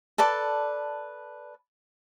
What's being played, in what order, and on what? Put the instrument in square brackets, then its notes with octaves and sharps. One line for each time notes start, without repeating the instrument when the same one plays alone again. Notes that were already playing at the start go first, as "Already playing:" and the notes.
[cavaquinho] A4 B4 D5 A5